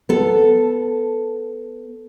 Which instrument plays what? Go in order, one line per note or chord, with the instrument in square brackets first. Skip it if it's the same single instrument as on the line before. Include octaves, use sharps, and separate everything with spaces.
[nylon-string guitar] B3 A4